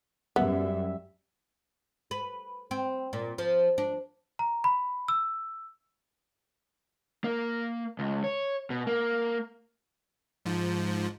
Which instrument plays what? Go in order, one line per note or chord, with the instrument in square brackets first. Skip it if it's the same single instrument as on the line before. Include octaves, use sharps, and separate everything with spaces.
[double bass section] F#2 [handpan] G3 [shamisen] B3 [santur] E5
[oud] B4
C4
A#2
F3
D4
[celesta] A#5
B5
E6
[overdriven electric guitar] A#3
C#2
C#5
B2
A#3
[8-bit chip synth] G#2 F3